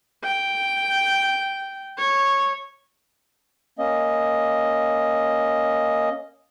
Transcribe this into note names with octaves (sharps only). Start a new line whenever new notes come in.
G5
C#5
A#3 C#4 D#5